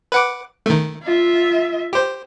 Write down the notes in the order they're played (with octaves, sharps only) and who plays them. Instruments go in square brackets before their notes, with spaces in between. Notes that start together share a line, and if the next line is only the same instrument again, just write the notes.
[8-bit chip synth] B4 F#5 D6
D#3 A3
[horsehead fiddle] F4 E5
[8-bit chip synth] G4 C5